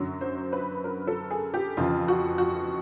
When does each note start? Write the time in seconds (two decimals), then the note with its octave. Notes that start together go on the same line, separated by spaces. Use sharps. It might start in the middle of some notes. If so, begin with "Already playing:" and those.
Already playing: F#2 D3 F#3
0.21 C5
0.53 B4
0.84 A#4
1.07 A4
1.30 G#4
1.54 G4
1.77 F2 C#3 E3 F4
2.08 F#4
2.38 F#4